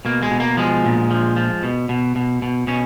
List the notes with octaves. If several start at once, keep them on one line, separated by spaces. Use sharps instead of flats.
B2 A#3
G#3
B2
A#3
F3 G#3
A#2
F3
F3
B2
B2
B2
B2
B2 C#4